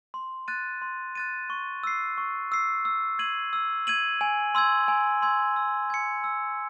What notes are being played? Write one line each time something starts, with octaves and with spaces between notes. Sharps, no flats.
C6
F#6 A6 D#7
C6
F#6 A6 D#7
C#6
E6 C7
C#6
E6 C7
E6
G#6 D#7 F#7
E6
G#6 D#7 F#7
G#5
C6 E6 G#6
G#5
C6 E6 G#6
E6
G#6 C#7
E6